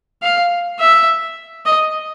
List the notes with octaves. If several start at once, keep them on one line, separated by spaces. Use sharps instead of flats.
F5
E5
D#5